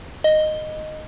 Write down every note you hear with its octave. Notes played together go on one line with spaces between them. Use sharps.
D#5